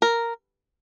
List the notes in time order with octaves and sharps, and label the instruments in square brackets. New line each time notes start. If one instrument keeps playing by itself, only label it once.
[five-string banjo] A#4